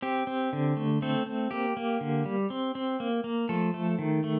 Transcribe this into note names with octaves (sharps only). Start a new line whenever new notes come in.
C4 G4
C4
D3
A3
A3 C4 A4
C4
A#3 G4
A#3
D3
G3
C4
C4
A#3
A#3
F3 A3 A4
A3
D#3
A3